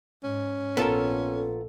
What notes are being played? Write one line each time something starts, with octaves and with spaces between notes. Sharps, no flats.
G#2 C#4
A#1 B3 F4 A4 A#4